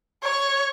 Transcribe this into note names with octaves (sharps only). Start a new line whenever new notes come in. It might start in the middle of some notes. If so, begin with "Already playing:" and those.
C#5